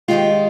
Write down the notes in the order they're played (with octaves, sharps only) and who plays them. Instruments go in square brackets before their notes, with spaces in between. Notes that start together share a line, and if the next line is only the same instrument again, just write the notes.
[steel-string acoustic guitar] G#2 D#3 G#3 F4 G4